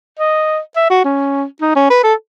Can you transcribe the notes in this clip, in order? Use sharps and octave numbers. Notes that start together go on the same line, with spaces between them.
D#5
E5
F#4
C#4
D#4
C#4
B4
A4